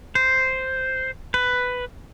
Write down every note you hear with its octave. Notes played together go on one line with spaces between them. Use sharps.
C5
B4